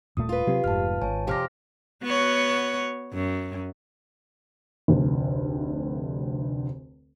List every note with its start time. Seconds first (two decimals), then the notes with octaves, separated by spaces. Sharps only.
0.17 D#1 A#2 A3 D#6
0.29 F4 B4
0.47 C3 F#3 C4 G4
0.64 F1 G#2 A5 F6
1.02 G#1 C#5 G#5 A5
1.27 F2 C3 G4 C5 F6 A#6
2.03 B3 F#4 C#5
3.14 F#2
4.88 F1 D2